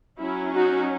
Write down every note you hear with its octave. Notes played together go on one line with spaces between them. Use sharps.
F#3 C#4 E4
D#4 F#4